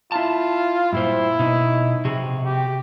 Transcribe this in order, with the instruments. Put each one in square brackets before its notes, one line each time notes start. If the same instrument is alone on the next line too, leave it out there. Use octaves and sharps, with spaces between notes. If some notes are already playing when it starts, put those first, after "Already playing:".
[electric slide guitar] E4 A5 [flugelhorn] F4
[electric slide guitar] G2 A#2 C5 [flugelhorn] E4
[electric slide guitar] B2 D#4
C3 F#4 G#4
[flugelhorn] G4